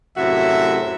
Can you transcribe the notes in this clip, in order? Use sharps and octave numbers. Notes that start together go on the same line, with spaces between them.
F#2 A2 C3 F#4 E5